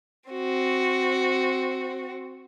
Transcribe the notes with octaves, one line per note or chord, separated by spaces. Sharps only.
C4 F#4